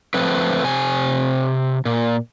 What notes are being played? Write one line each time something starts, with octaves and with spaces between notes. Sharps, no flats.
F3 A3 C4 B4
C3 G#5
A#2